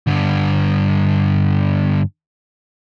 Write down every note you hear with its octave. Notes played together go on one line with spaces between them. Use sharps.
G2 D3